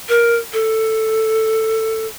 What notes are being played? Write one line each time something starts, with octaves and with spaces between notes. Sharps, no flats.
A#4
A4